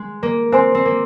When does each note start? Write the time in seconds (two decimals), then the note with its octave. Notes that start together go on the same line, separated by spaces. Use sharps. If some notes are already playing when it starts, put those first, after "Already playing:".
Already playing: G#3
0.23 A#3
0.52 C4 C5 G#5 C6
0.75 C4
0.85 A#3